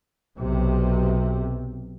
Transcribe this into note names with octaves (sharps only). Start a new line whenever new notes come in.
B1 C3